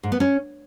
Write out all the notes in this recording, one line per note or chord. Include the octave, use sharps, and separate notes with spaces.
G#2
B3
C#4